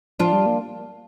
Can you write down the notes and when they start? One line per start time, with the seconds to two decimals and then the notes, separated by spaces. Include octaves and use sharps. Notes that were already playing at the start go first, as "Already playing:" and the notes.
0.19 F3 D4 F4
0.32 G3
0.46 A#3